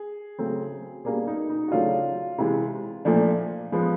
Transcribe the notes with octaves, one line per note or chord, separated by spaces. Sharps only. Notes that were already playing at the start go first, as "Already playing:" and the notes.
Already playing: G#4
C#3 F#3 A3 C4
B2 G3 A#3 D4 G#4
D#4
D#4
F#4
C#3 F#3 A3 D4 F4
C3 E3 G#3
A#2 F3 A3 D4
F3 G#3 B3